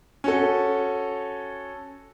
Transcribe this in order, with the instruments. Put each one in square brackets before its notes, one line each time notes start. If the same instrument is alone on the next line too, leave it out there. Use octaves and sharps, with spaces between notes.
[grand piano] C#4 F#4 A4